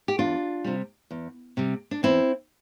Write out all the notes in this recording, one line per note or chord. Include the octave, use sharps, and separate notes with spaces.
G4
E2 D4 F4
C3 G3
E2
C3 G3
D4
E2 C4 E4